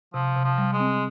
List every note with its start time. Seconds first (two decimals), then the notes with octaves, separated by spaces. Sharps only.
0.14 C3 F3
0.36 C3
0.44 F3
0.58 G3
0.73 G#3
0.80 C4